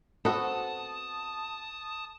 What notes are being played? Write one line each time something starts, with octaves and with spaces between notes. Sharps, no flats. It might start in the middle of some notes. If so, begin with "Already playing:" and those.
B3 C4 F#4 A4 A5 D#6